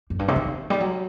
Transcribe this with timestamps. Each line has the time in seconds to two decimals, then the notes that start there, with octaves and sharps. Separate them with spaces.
0.10 F#2
0.19 G2
0.28 C3
0.36 D#3
0.70 G3
0.80 F#3